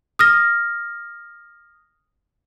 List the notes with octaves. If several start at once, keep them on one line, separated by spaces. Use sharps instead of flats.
D#6 F6 A#6